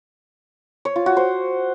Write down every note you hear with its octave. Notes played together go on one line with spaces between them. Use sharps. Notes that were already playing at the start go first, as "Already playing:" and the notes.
C#5
F4
F#4
C5